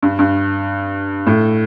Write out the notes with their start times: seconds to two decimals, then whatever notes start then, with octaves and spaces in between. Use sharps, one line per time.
0.03 G2
0.19 G2
1.27 A2